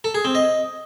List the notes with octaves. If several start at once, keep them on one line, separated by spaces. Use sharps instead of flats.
A4
G#4
C4
D#5